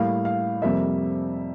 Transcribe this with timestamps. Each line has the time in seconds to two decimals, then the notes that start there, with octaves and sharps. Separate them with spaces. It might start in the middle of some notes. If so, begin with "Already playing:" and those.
Already playing: A2 G3 A#3 F5
0.25 F5
0.62 F2 C3 G3 A#3 E5